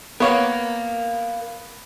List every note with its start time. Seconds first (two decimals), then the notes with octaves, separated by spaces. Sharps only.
0.20 B3 A#4 C#5 F5